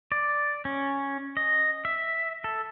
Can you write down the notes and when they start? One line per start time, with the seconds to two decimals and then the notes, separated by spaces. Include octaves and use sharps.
0.12 D5
0.65 C#4
1.37 D#5
1.85 E5
2.44 A4